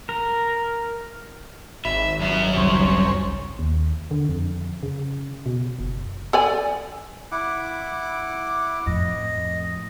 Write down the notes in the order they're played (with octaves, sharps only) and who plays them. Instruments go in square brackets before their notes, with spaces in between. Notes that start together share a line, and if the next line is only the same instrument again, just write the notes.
[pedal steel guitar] A#4
[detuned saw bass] G#1 [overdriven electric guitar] E5 [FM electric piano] B5
[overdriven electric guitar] F#2 E5
[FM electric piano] C#2 G3 [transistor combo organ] C#3 C4 C#4
[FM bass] D#2
D3
F2
C#3
B2
F#1
[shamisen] A4 D5 G#5
[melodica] E4 F#5 D6
[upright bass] F2 A2 [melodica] D#5